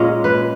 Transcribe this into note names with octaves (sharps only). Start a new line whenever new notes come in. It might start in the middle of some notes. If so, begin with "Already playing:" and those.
Already playing: A#2 G#3 C#4 D#5
B4